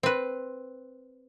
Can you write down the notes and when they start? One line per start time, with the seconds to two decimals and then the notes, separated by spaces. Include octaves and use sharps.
0.03 C4 B4